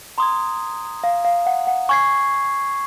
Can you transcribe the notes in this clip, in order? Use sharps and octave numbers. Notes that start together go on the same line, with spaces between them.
A#5 C6 D#6 G#6
F5
F5
F#5
F#5
G#5 C#6 G#6 C7